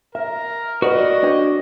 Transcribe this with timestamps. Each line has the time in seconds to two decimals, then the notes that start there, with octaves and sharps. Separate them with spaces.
0.15 A#4 E5
0.82 F#4 B4 D5 D#5 F#5
1.23 D4 C#5 G5